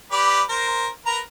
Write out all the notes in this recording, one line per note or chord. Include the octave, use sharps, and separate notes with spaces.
G4 B4 D5
A#4 C5
A#4 B4 A#5